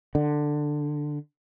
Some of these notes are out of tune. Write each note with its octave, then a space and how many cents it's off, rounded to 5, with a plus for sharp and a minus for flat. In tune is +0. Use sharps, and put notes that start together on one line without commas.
D3 +10